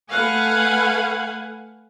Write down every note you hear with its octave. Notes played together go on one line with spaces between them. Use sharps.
A3 B4 F5 F#5 G#5